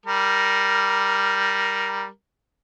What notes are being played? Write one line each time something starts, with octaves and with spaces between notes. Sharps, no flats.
G3 A#4